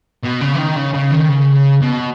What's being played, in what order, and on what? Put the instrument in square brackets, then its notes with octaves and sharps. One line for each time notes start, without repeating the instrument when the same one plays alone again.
[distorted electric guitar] B2
C#3
E3
D#3
C#3
C#3
D#3
C#3
B2